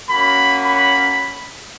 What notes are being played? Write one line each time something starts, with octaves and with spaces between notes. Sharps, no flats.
A#3 C#4 F#4 B5
B5